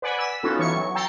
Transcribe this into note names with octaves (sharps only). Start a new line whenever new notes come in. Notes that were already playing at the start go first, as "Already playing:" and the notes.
B4 D5 F#5 G#5 B5
E6 B6
B3 C#4 D#4 F4 F#4 A4
E3 C#5 C#6 C#7
F#3
G5 A#5 E6 A6 C7 C#7